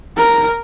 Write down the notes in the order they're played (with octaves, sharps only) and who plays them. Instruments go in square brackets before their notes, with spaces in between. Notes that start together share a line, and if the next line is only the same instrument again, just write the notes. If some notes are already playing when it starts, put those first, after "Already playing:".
[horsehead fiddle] A#4